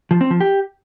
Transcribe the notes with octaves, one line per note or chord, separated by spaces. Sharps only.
F3
C4
F3
G4